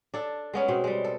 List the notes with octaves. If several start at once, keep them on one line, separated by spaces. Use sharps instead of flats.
D4 A4
G#3 B3 C#4
B2 C4
G3 G#3
A4